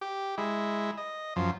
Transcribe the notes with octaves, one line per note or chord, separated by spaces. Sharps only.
G4
G#3 E4
D#5
F#2 F3